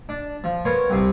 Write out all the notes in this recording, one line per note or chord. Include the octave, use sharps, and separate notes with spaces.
D4
F3
B3 A#4 C5 C#5
C2 C3 C4